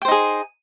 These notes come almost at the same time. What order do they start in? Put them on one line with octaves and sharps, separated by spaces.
G5 C5 D#4 G#4